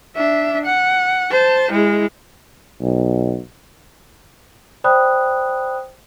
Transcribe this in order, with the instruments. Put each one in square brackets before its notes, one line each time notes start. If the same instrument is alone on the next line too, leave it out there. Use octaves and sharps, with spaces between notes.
[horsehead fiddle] D4 E5
F#5
C5 A5
G#3 E4
[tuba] B1
[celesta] C5 D5 G5 B5 D#6 F#6